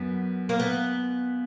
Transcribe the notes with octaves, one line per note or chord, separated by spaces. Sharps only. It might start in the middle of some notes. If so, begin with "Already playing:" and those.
Already playing: F#2 B3
A#3
B3